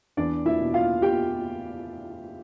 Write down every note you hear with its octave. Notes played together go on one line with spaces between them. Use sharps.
E2 D4 D5
E4 E5
B2
F4 F5
G4 G5